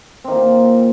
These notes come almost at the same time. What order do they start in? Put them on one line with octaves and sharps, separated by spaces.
C4 D#3 A#3 A#2